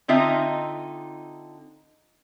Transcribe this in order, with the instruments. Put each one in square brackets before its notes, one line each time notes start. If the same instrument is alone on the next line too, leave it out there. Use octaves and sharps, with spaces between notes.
[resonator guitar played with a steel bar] D3 C4 D#4 F4 E5